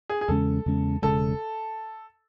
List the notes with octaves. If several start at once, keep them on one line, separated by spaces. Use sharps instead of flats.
G#4
G#4
E2 C#3 G#3 C#4 A4
E2 C#3 G#3 C#4
E1 D#2 C#3 G#3 A4